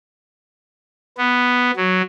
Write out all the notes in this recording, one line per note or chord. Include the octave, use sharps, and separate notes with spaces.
B3
F#3